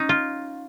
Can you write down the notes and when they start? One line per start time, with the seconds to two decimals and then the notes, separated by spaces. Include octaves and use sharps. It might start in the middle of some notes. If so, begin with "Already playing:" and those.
Already playing: C#4 D#4
0.09 F4